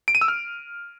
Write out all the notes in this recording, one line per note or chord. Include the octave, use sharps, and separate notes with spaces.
D7
D#7
E6
F6